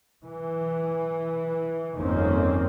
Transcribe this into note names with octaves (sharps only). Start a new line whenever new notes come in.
E3
G1 F2 D#3 A#3 C4 C#4